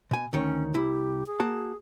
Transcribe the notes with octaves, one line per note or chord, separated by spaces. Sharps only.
B2 G#5
D2 D#3 C#4 C#5
C2 E4 G4
G#4
A#3 F#4 A5